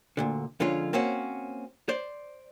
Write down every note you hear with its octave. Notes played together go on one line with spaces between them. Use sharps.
D2 A#2 D3
F2 D3 G#3 C#4 F4
A#3 C4 C#4 F#4
C5 D5